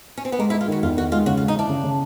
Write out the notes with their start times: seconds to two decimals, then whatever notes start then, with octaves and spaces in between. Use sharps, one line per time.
0.17 C#4
0.25 C4
0.32 B3
0.39 G#3 A#3
0.50 E4
0.54 G#3
0.61 F4
0.68 D#3 F#4
0.83 E2 F4
0.97 D#3 F#4
1.12 G#3 F4
1.26 C#3 F#4
1.37 F4
1.41 G#3
1.48 D#4
1.56 E3 D4
1.69 C#3
1.84 C#3